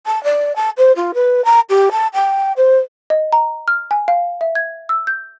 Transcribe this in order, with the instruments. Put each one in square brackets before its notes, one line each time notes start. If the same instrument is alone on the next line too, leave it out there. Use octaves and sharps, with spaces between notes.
[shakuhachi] A5
D5
A5
C5
F4
B4
A#5
G4
A5
G5
C5
[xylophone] D#5
A#5
F6
G#5
F5
E5
G#6
E6
G6